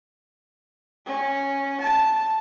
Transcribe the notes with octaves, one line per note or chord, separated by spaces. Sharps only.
C#4
A5